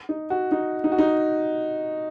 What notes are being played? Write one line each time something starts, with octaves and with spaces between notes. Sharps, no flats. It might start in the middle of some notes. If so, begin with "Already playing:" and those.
D#4
F#4
D#4
D#4
F#4
D#4